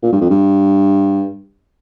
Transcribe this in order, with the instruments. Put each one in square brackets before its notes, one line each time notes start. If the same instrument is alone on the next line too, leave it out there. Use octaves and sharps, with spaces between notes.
[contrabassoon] A#2
G2
F2
G2